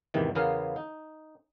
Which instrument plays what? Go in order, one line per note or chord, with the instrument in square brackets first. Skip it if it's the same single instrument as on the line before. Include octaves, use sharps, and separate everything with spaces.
[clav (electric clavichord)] E2 G#2 C3 D#3 E3
E2 C#3 B3 A#4 F5 G#5
D#4